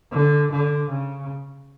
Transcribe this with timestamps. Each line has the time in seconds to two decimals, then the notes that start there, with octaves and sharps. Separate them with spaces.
0.12 D3
0.52 D3
0.90 C#3